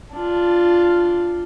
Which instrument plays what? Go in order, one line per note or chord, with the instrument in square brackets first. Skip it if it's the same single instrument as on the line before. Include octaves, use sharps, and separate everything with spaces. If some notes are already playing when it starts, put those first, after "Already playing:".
[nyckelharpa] D4 F4